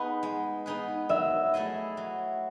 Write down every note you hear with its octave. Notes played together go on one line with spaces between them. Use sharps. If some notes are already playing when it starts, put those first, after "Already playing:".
Already playing: B3 D#4 G#4 B4 F#5
G#3
B3 D#4 G#4 B4
F#3 E5
A3 E4 G#4 D#5
F#3